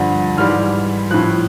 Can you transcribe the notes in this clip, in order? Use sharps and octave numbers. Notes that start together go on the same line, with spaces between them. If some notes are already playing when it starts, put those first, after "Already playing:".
Already playing: G2 D3 F3
G#2 E3 G3 F6
A2 F3 F#6